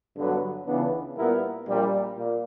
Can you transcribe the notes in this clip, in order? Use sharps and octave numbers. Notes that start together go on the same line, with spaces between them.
G2 D3 F#3 B3
C#2 C#3 E3 B3 D4
A#2 G3 B3 E4 A#4
A#1 A#2 G3
A#2